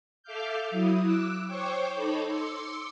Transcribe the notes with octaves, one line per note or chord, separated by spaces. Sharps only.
A4 E5 F5 D6 F6 G6
F#3 E4 D#6
D6 E6 F#6
C5 C#5 G5 C#6 D6
D#4 A4 C#5 B5 D6
C6 D6 E6 C#7